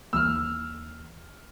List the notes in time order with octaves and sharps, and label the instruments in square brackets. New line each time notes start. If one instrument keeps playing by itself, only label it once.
[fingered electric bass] D#2 E3 A#3 [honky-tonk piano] E6 F6